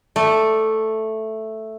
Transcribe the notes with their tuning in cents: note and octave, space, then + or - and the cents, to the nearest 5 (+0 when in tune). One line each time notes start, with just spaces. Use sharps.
A3 +0 D5 +10